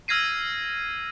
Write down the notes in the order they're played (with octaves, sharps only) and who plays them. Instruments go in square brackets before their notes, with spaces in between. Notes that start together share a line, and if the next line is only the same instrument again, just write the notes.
[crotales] E6 F6 G#6 A#6 C7 D#7